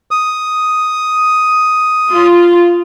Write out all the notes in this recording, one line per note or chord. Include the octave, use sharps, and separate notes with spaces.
D#6
F4